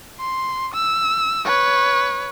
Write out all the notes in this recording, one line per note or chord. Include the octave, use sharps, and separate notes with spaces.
C6
E6
B4 C#5